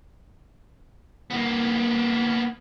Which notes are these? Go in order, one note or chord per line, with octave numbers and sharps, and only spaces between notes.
A#3 B3